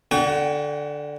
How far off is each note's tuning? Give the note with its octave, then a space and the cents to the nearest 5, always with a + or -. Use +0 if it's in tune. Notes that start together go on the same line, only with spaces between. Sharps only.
D3 +0 F#4 +35 G5 +40